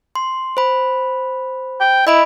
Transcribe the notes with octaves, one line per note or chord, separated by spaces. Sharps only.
C6
C5 B5
G5
E4 D#5 B5 D7